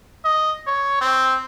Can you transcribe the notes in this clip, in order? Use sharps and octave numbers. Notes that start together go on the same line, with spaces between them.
D#5
C#5
C4